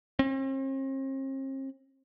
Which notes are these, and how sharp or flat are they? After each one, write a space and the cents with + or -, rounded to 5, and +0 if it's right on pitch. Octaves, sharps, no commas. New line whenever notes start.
C4 +45